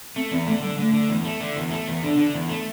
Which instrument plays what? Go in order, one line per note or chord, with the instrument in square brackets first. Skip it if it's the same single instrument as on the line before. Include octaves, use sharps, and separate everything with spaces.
[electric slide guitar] A3 [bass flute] C4
[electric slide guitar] E2 [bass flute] C4
[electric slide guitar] D3 [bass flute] A3
[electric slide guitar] D3 [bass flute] G3
[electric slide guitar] D3 [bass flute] A3
[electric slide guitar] D3
E2
A3
D3
E2
A3
E2
[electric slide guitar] D3 [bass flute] D4
[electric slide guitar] D3
E2
A3